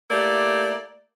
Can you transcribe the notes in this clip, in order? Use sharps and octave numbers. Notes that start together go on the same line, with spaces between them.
A3 A#3 E4 G4 D5